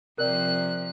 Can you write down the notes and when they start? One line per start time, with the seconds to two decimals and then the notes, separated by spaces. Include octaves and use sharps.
0.18 C3 F3 A#4 D5 F#6